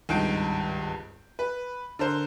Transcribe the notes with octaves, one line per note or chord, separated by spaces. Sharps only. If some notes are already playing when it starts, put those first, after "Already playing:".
G#1 C#2 G2 D#4 G6 D7
B4
D3 A#4 C5